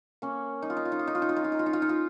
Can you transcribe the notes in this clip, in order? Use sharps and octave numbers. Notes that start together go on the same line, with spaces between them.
A#3 C#4
D#4
F4
D#4
F4
D#4
F4
D#4
F4
D#4
F4
D#4
F4
D#4
F4
D#4
F4
D#4
F4